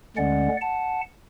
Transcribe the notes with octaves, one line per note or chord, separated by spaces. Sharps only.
D2 D3 G#3 C#4 D5 F#5
F#5 A5